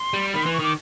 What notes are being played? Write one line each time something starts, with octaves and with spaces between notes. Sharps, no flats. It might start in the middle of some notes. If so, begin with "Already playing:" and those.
Already playing: C6
G3
D#3 B5
E3 C6
C#6
D#3 D6